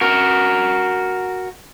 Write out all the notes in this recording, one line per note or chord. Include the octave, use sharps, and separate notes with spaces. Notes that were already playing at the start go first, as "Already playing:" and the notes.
F#4 A#4